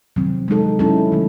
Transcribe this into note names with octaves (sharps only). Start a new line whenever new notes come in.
C3 D#3 F#3 C4
G#3 D#4 A4
F#3 C#4 E4 A4
D#3 A3